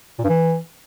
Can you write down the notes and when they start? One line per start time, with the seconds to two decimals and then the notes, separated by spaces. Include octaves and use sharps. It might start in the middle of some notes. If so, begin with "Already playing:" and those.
0.19 A#2
0.24 G2
0.29 E3